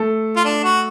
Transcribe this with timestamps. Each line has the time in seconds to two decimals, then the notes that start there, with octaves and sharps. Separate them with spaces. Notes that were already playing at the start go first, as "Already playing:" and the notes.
Already playing: A3 A4
0.36 F4
0.45 D4
0.64 F#4